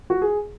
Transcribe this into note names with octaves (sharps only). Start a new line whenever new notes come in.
F#4
G#4